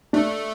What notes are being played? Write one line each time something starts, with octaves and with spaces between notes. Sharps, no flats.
A3 D4